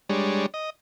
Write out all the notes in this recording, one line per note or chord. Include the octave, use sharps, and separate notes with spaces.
G3 G#3 D4 C#5
D#5